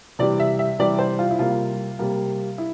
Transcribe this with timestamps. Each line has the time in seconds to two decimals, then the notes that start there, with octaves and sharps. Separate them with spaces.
0.19 C3 E3 G3 D5
0.40 E5
0.59 E5
0.79 C3 E3 G3 D5
0.99 C5
1.19 F4
1.31 E4
1.39 C3 G3 A#3 F4
1.99 C3 G3 A#3
2.58 E4